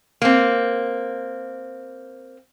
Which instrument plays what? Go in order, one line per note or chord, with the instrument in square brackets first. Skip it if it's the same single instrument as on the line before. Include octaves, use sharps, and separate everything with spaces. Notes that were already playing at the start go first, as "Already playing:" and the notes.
[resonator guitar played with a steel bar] A#3 C4